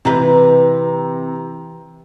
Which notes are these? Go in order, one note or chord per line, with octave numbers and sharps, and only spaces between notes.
C3 E3 G4 B4 A#5